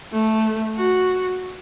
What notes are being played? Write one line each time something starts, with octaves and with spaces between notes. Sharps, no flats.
A3
F#4